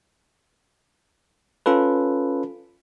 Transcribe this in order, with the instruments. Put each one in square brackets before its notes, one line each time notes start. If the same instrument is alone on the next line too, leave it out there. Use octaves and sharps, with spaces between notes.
[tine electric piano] C#4 F4 A4 B4